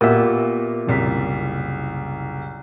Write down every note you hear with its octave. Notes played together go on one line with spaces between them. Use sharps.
A#2 B3 F#4 G4 E5
F#1 C2 B6